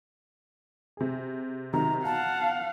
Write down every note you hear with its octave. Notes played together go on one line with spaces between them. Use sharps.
C3 G#4
C3 D#3 F#3 A#5
B1 F5 F#5 A5